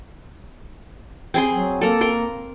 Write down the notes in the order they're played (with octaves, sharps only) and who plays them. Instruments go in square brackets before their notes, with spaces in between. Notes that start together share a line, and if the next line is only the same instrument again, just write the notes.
[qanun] C4 G#4 C6
[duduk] F#3
[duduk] A#3 [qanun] A4 A#4
[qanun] A#4 C6